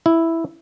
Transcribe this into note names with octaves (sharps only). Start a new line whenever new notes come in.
E4